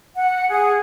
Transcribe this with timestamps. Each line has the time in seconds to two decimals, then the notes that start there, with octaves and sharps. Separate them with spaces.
0.16 F#5
0.49 G#4